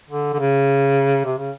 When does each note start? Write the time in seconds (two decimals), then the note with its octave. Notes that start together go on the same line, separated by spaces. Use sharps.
0.10 D3
0.33 D3
0.39 C#3
1.25 C3
1.38 C#3